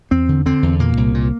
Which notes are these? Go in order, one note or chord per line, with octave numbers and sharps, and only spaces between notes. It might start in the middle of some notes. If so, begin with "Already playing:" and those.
E2 C4
D3
D3 C4
E2
A#2 A#3
C2
A#2